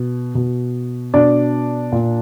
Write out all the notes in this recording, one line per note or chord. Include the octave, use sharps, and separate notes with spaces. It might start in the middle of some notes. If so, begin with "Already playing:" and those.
Already playing: B2
B2
B2 D4 D5
A#2